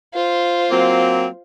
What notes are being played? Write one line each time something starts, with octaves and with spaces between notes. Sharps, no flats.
F4 C5
F#3 A#3 C4